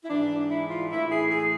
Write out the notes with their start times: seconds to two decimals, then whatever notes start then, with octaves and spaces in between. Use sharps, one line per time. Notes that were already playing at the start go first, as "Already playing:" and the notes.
0.04 E4
0.10 G#2 E3 D4
0.50 E4
0.70 F4
0.91 A2 E3 E4
1.11 G#4
1.31 G#4